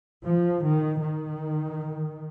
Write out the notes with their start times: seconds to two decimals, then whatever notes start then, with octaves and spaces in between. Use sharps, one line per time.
0.26 F3
0.63 D#3
1.02 D#3